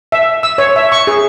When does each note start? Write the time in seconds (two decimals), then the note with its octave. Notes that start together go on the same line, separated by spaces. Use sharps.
0.12 E5
0.43 E6
0.58 C#5
0.76 E5
0.92 C#6
1.07 G#4